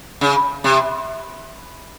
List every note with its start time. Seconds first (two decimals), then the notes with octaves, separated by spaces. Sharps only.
0.21 C#3
0.64 C3